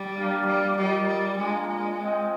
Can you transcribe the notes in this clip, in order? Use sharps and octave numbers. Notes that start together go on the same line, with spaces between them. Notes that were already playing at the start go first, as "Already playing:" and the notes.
Already playing: G3
A#3 D4 G4 D5 F5
G3
G3 F4 A#4 D#5
G3
G#3 A#3 D4 F4
G#3
C4 F4 C5 D#5 G5